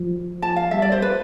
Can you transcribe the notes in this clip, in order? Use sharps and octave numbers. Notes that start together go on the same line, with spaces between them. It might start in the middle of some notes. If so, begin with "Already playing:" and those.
Already playing: F3
A5
F5
G3 E5
D5
C5
B4